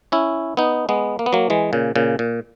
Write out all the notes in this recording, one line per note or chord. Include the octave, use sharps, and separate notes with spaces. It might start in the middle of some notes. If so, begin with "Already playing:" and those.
C#4 E4
B3 D#4
G#3 B3
A#3
B3
F#3 A#3
E3 G#3
A#2 C#3
A#2 C#3
A#2